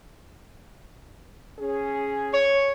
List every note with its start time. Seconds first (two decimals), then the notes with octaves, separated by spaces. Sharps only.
1.59 C#4 G#4
2.34 C#5